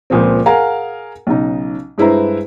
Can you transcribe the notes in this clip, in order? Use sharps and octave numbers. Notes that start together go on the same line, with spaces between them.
C#2 A#2 F3 C4
G#4 A#4 F5 F#5 G#5 A#5
B1 C#3 D#4
G2 G#3 E4 B4 C5 A#5